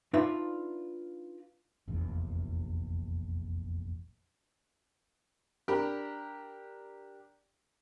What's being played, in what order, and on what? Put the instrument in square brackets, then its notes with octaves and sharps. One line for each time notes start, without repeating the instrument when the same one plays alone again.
[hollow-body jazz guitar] D4 D#4 F4 B4 D5 E5
[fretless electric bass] F1 A#1 E2
[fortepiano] D4 G4 A#4 B5